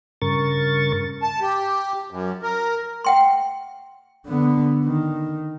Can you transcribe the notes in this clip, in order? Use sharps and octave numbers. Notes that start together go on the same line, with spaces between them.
G2 C#3 A#4 C#6 A6
A5
G4
F#2
A#4
F#5 G5 C6
D3 B3
D#3